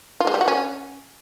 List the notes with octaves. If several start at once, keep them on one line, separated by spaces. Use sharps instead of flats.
F4
G#3
G3
F#4
C#4